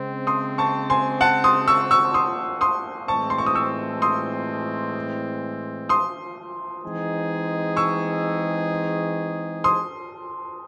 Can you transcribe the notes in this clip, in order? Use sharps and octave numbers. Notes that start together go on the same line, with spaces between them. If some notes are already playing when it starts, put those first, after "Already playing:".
Already playing: C#3 G#3 C4
C6 D#6
A5 C#6
G#5 C6
F#5 A5
C6 D#6
C#6 E6
C#6 E6
C6 D#6
C6 D#6
A2 E3 G#3 C4 A5 C#6
C6
C#6
D#6
C#6 E6
C6 D#6
C6 D#6
E3 G#3 C4 D#4 G#4
C#6 E6
C6 D#6